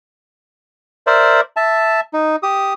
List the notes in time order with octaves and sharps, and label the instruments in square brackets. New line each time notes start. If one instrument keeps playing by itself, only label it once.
[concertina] A#4 C5 D5 E5
E5 A5
D#4
G4 D#6